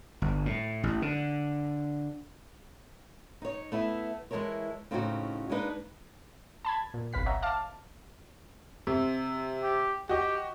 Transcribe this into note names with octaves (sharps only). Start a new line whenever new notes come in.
G1
A2
A1
D3
D#4 C#5
A3 B3 E4
E3 G#3 E4 A4 A#4 C#5
A2 C#3 C4 C#4 D#4 F#4
G#3 A#3 D4 D#4 B4
A5 B5 G#6
A#2
G1 C2 B4 F5 B6
C#5 D#5 E5 F#5 A#5
F5 A5 D6 F6
C3
G4
F#4 G4 D#5